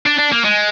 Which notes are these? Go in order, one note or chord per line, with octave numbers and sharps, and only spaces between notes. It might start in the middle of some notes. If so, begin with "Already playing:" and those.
D4
D4
A#3
G#3